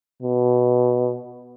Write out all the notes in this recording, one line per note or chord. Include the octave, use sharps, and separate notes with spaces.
B2